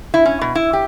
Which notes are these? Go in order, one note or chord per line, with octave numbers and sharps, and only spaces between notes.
E4
C#4
B2
E4
G4